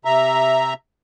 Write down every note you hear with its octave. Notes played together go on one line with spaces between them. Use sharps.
C3 E5 A#5